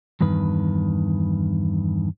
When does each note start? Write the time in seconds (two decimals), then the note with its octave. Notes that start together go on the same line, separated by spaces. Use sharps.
0.21 E2 G2 D#3 B4